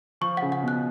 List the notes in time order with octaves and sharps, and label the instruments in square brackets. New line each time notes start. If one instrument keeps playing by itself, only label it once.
[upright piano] F3 [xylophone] C#6
[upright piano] C#3 [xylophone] F#5
[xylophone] F#5
[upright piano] B2
[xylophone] F#6